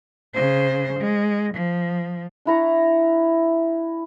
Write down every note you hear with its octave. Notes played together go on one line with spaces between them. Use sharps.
C#3 C5
G#3
F3
D4 E4 A#5 C#6